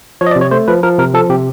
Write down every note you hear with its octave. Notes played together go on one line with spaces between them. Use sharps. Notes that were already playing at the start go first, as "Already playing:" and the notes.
F3 C#5
D#5
D5
C3
C#5
A3 C5
F3 B4
F3 A#4
C3 A#4
F3 A4
C3 G4